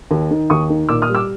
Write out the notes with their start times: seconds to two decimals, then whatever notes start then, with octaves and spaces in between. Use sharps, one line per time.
0.11 D#2
0.31 D#3
0.50 D#2 C#6 D#6
0.70 D#3
0.89 A#2 D6 E6
1.02 D#6 F6
1.09 G3
1.15 D6 E6